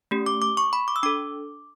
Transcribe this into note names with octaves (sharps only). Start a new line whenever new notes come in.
A3 C#4 G4
D6
D6
C#6
B5
D6
E6
D4 A4 D6